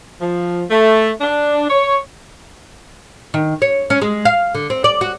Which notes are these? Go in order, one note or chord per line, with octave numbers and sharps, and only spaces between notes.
F3
A3
D4
C#5
D#3
C#5
C#4
G#3
F5
D3
C4
D5
F#4